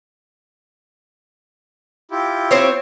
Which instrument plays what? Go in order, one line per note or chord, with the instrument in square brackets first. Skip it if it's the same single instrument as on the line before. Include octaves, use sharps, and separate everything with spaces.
[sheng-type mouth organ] E4 F4 G4
[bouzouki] C4 C5 C#5